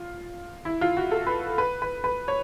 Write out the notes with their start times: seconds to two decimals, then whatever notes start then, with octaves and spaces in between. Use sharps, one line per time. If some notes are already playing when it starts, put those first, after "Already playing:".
Already playing: F4
0.65 E4
0.81 F4
0.97 F#4
1.11 A4
1.27 B4
1.58 B4
1.82 B4
2.04 B4
2.28 C#5